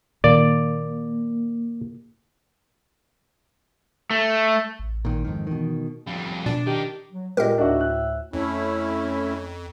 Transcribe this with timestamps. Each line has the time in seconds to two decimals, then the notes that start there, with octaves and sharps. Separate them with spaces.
0.24 A#2 D#3 A#3 D5
4.10 A3
4.79 A1
5.05 A#2 D#3
5.25 F2 G#2 D#3
5.47 B2 D#3 E3
6.07 F2 G3
6.46 B2 D4
6.67 D#3 G4
7.12 F#3
7.37 A#2 G#3 G4 A#4 D#5
7.58 D2 A2 D4 D#4 F#4 E5
7.81 F#6
8.33 F2 A3 C#4 E4